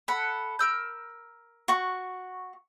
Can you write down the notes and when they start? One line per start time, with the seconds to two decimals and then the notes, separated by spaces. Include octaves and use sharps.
0.08 A4 F#5 B5
0.59 A#4 E6 G6
1.68 F#4 C#6